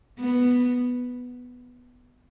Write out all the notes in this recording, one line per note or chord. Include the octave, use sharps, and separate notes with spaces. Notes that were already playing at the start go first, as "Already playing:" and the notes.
B3